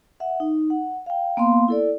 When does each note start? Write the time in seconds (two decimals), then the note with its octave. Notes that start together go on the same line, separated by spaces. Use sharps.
0.20 E5 F#5
0.40 D#4
0.70 F#5
1.06 F5 G5
1.37 A#3 B3 F5 C6
1.68 E4 A4 D5